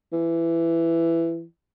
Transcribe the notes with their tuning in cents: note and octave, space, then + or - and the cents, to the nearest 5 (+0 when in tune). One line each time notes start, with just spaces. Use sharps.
E3 +15